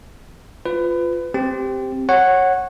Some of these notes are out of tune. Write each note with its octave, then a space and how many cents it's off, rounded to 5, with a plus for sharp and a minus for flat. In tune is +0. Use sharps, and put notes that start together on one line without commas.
F4 +0 B4 +25
C4 +0 G4 +0
C#5 -15 F#5 +0